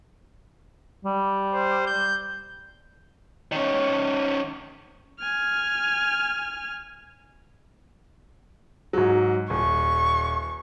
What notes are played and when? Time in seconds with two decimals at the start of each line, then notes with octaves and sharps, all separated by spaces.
1.05 G3
1.53 C5
1.87 G6
3.52 D#3 C#4
5.20 G#5 F6
8.93 G#2 F#3
9.50 D#1 C#6